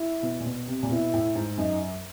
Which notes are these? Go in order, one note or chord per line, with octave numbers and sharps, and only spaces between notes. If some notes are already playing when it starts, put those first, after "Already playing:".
Already playing: E4
B2
A#2
B2
C3
A#2
B2 E4
A2
G#2
F#2 D#4